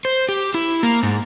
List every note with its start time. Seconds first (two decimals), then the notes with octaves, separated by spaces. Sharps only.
0.05 C5
0.29 G4
0.54 E4
0.83 A#3
1.03 G#2